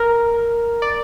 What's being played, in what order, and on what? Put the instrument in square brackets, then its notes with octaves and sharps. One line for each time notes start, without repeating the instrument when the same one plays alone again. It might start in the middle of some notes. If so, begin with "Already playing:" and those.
Already playing: [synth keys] A#4
D5